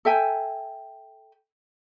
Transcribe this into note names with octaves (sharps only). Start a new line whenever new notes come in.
A4 E5 G5 G#5